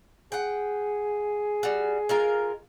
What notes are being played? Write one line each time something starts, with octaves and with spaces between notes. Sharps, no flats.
G#4 F#5 G5
G3 F#4
G#3 F4 A#4